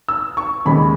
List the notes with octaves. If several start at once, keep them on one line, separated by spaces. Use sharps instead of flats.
E6
C#6
D#2 C#3 G#3 B5